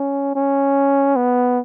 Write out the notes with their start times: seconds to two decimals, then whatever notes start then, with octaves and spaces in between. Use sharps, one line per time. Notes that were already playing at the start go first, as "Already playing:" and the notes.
Already playing: C#4
0.35 C#4
1.16 B3